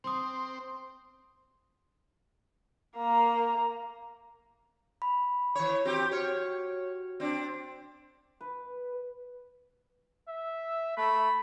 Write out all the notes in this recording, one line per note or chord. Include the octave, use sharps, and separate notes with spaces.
C4 C6 D#6
A#3 A#5
B5
E3 C#5
C4 F#4 G4
F#4 C#5 F6 C#7
C4 D4
B4
E5
A3 B5